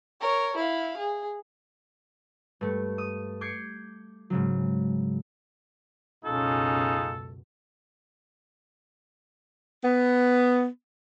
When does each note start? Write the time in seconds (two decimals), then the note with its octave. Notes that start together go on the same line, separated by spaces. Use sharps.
0.21 A#4 C#5
0.56 E4 F5
0.97 G#4
2.61 G2 A3
2.98 D#6
3.41 D6 G6 G#6 C7 C#7
4.30 G#2 C#3 F#3
6.25 C#2 F#2 B2 C#4 D#4 F4 G#4 A4
9.83 B3